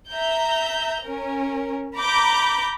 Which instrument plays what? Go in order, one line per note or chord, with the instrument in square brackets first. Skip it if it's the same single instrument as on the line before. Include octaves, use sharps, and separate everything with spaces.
[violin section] E5 A#5 G6
C#4 A#4
A#5 B5 D6 G6